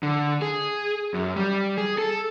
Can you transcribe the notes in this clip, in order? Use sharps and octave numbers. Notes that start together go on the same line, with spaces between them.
D3
G#4
F#2
G3
G#4
A4